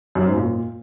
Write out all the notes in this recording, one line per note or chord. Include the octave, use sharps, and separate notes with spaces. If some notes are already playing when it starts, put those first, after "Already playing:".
F#2
G#2
A#2